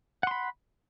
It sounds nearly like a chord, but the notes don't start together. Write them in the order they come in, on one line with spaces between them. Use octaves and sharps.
F#5 C6 B5